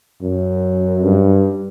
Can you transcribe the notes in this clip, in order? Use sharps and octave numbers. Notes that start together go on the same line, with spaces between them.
F#2
G2